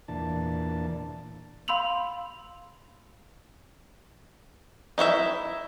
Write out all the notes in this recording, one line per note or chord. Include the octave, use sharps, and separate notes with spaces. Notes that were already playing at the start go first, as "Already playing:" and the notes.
E2 A#2 D4 A5
F5 B5 C6 E6 F7 F#7
D#4 E4 F#4 E5